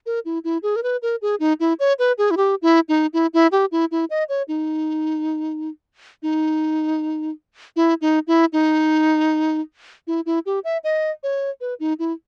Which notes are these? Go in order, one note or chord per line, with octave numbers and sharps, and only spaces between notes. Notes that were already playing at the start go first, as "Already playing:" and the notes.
A#4
E4
E4
G#4
A#4
B4
A#4
G#4
D#4
E4
C#5
B4
G#4
E4
G4
E4
D#4
E4
E4
G4
E4
E4
D#5
C#5
D#4
D#4
E4
D#4
E4
D#4
E4
E4
G4
E5
D#5
C#5
B4
D#4
E4